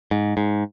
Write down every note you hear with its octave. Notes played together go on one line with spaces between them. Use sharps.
G#2
G#2